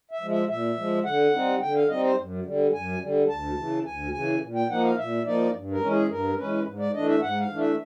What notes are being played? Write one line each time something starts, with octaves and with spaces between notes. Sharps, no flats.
E5
F3 G#3
E5
A#2 E5
F3 G#3
D3 F#5
G3 C4 D#4
D3 G5
F5
G3 C4 D#4 D#5
C5
F#2
D3 G3
F#2 G#5
D3 G3
D2 A5
C#3 E3
D2 G#5
C#3 E3 G#5
A#2
G5
F3 A#3 D#4 F#5
F5
A#2 E5
F3 A#3 D#4 D5
G2
A#4
E3 G#3 C#4
G#4
G2 A#4
E3 G#3 C#4 B4
G#2
D5
E3 A3 D4 D#5
E5
G#2 F#5
F5
E3 A3 D4
E5